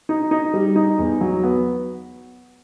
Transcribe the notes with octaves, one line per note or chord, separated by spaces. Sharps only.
D#4
D#4
G3
D#4
E2
F#3
B3